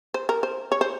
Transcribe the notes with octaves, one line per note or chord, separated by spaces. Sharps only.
C5
A#4
C5
C#5
C5